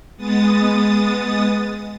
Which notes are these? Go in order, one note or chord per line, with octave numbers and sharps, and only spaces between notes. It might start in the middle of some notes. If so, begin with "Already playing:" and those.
G#3 B3 D#6 A6